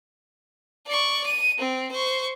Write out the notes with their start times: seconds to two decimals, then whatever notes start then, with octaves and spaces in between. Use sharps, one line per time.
0.87 D5 C#6
1.26 D#7
1.58 C4
1.92 C5 C#6